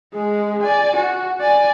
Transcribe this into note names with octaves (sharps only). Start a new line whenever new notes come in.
G#3 G#4
D5 G#5
F#4
D5 G#5